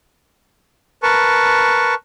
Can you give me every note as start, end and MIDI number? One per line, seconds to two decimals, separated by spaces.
1.03 1.94 70
1.03 1.94 71
1.03 1.94 81
1.03 1.94 85